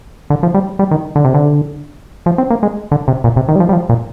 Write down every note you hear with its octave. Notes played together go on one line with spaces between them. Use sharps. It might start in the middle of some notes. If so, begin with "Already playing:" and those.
D3
F3
G3
G3
D#3
D3
C3
D3
F3
C4
A#3
G#3
D3
C3
A#2
C3
D#3
G3
F3
G3
F3
A#2